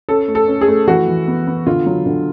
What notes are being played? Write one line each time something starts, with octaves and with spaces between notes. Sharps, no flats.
C#4 A4
A3
A4
C#4
G#4
A3
E3 F#4
E3
B3
B3
D3 F4
F#3
D3